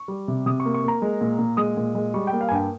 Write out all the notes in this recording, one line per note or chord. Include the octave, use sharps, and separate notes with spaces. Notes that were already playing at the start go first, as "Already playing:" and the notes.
Already playing: C#6
G3
C3
C3 D#6
C#6
A#3
C#6
A#3 A#5
G#3
A#2
A#2
G#3 D#6
A#2
G#3
G3 C#6
G5
A#3
F5
G#5
G2 G5